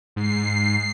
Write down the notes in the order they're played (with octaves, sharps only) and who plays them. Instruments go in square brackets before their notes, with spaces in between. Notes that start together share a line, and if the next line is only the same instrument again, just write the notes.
[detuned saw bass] G#2 [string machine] C7